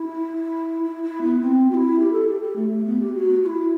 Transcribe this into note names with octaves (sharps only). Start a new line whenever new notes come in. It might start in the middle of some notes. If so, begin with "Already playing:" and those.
Already playing: E4
E4
E4
B3
C4
F#4
E4
G4
A4
G4
G4
A3
A3
B3
G4
F#4
F#4
E4